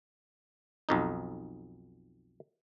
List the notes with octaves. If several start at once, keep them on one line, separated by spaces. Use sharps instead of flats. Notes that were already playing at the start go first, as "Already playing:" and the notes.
B1 F2 D#4